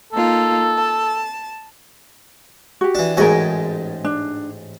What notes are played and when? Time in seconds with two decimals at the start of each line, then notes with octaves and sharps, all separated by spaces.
0.13 A#3 D#4 F4 A4
0.77 A5
2.81 F#4 G4
2.95 E3 D4
3.17 A1 G#2 F#4 G#4 A#4 G#5
4.05 D4